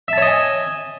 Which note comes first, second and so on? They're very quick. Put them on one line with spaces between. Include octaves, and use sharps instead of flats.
E5 A5 C#5 D#5 G#5